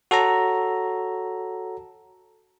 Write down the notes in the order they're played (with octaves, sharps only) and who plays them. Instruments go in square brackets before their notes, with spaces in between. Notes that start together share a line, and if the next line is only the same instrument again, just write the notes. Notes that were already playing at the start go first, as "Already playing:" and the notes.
[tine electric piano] F#4 A4 C#5 A#5